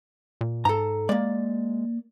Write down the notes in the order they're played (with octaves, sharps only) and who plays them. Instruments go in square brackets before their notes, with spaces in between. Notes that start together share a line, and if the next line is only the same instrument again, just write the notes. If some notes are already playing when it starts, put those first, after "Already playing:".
[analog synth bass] A#2
[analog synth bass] G#2 [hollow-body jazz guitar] A4 A#5
[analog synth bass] G#3 [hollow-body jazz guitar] A#3 D5